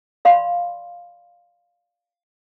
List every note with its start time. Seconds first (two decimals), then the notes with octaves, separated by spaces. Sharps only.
0.25 D5 F5 B5 C6